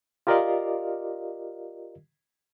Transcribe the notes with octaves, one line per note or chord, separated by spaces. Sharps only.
F4 G4 A#4 D5 D#5 F5